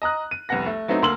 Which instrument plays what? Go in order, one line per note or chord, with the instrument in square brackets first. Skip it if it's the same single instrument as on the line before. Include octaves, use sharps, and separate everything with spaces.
[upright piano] D#5 A#5 D#6 F#6
D#7
F1 C2 B3 F#5 A#6
A3
F#3 A3 B3 C4 D#4
D2 A#3 C6 E6 F#7